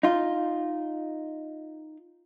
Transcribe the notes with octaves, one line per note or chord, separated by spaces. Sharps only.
D#4 F4